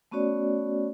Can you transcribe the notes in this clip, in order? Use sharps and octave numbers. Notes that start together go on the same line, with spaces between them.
A3 B3 C#4 F#4 C#5 D5